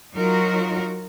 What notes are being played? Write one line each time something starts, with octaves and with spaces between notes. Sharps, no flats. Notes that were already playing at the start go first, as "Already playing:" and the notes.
F#3 D#4 F4 F#4 A#4